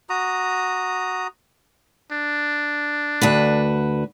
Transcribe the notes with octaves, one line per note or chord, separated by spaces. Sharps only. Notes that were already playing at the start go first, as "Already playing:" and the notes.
F#4 A#5 D#6
D4
D2 F#4 B4